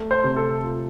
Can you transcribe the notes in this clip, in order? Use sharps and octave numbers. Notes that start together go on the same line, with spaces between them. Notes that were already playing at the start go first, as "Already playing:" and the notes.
Already playing: A3
C5
C3
A4
F4